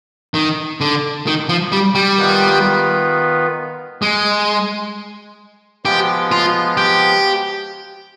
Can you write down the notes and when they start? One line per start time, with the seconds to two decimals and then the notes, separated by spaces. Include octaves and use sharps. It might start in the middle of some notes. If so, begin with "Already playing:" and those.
0.34 D#3
0.81 D3
1.27 D#3
1.49 F3
1.72 G3
1.95 G3
2.18 D#3 B3 F4 B4
4.02 G#3
5.85 F3 G#3 B3 G4
6.32 F4
6.77 G4